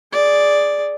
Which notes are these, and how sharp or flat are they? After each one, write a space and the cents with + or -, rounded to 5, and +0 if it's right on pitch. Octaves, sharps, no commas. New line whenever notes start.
G#4 +0 D5 +0